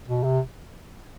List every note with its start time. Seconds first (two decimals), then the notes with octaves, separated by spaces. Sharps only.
0.08 B2
0.24 C3